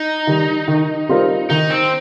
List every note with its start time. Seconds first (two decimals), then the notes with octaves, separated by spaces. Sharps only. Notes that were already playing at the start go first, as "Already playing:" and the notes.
Already playing: D#4
0.27 D#3 G3
0.68 D#3
1.09 G3 C4 F4 A#4
1.50 D#3 D#4
1.70 C4